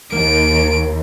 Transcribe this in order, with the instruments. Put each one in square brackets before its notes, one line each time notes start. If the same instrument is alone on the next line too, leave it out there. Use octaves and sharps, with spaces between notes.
[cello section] D#2 [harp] A#3 [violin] D7